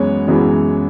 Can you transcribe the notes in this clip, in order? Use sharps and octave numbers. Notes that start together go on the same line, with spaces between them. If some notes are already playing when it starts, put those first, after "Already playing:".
Already playing: F#2 E3 G#3 B3 C#5
F#2 E3 G#3 B3